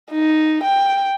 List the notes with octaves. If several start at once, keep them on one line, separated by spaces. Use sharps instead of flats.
D#4
G5